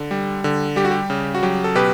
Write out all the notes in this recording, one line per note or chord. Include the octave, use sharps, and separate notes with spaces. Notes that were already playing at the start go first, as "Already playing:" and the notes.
Already playing: D3
G3
D3
G3 G4
F#4
G4
C#3
F#4
F#3 G4
A4
B2 G4 B4